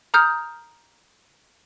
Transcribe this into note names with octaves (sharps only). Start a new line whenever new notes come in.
A#5 D#6 F6 G6